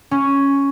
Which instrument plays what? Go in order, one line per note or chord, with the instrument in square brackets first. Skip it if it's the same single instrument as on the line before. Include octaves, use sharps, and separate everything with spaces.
[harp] C#4